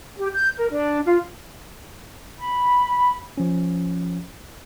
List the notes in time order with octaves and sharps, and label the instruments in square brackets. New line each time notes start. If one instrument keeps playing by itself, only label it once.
[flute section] G4
G6
A#4
D4
F4
B5
[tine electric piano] F3 C#4